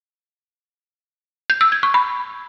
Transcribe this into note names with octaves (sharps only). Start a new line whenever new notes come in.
G6
E6
G#6
C#6
B5